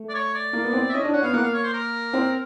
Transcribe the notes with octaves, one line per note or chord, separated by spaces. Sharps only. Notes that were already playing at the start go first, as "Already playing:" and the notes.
Already playing: A3
D5
C#5
D5
A#3
B3
C4
E5
C#4 D#5
D4
C#4 F#5
B3 F5
A#3 F#5
F5
C#5
C5
A#4
C4